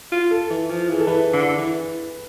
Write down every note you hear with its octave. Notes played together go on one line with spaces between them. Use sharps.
F4
A4
E3
F3
E3 G#4
A4
E3 B4
D3
E3